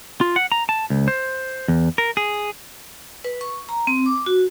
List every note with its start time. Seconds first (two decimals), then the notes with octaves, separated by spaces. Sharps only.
0.21 F4
0.36 F#5
0.52 A#5
0.69 A5
0.90 C#2
1.08 C5
1.68 E2
1.98 A#4
2.17 G#4
3.24 B4
3.41 C#6
3.69 A#5
3.87 C4
4.06 D6
4.26 F#4